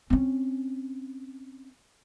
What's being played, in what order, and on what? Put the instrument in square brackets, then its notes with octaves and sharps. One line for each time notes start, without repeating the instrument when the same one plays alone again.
[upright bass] C4 C#4